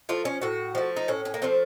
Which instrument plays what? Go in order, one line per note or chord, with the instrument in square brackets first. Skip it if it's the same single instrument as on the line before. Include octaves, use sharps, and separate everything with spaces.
[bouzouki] F3 A3 F4
C#4
A2 F#4
F3 A3
D#4
A2 C#4
C#4
A#3
F3 A3 C4